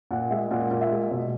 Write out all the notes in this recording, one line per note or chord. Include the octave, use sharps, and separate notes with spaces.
A#2 F#5
G#3 E5
A#2 F#5
A#2
E5
G#3
B2